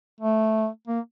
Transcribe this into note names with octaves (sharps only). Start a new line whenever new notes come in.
A3
A#3